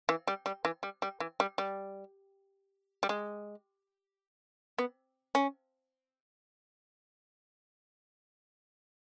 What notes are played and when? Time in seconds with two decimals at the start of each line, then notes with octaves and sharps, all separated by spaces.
0.09 E3
0.27 G3
0.46 G3
0.65 E3
0.83 G3
1.02 G3
1.20 E3
1.40 G3
1.58 G3
3.03 G3
3.09 G#3
4.78 B3
5.35 C#4